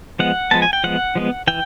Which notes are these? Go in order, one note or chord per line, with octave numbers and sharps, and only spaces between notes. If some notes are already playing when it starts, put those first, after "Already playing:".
F3 G#3 B3 F#5
F3 G#3 B3 A5
G#5
G5
F3 G#3 B3 F#5
F3 G#3 B3
E3 G5